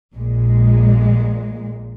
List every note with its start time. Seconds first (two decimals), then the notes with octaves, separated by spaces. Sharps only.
0.15 A#1 A#2 G#3